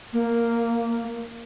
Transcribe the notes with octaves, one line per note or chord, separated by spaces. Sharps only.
A#3